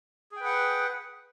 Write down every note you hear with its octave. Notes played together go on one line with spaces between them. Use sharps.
G#4 B4 F#5 G5